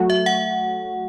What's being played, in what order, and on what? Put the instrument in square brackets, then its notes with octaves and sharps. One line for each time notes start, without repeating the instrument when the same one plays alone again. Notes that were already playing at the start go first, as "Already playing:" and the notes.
Already playing: [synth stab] F#3 A3 F#4
[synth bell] E5
F#5